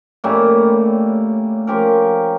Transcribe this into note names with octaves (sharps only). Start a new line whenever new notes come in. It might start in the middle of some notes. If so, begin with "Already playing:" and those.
A2 G3 A#3 C#4
F3 C#4 G4 A#4